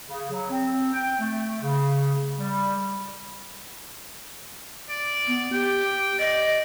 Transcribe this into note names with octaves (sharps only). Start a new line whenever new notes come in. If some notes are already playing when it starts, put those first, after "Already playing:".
C#3
F#3
C4
G5
A3
C#3
G3
D5
B3
G4 G5
D5 D#5